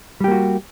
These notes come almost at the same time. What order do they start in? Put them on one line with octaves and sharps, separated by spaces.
G3 G4 A#3 F#4